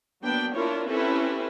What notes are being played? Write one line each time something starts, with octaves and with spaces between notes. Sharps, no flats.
F#3 A#3 B3 D4 G5
D4 E4 F4 A#4 C#5
C4 C#4 E4 G4 A4 B4